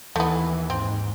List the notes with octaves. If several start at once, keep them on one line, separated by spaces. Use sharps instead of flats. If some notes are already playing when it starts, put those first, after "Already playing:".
D#2 E3 A3 B3
G#2 C4